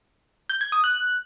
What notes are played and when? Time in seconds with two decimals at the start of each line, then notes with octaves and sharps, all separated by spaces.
0.50 G6
0.61 G#6
0.72 D#6
0.84 F#6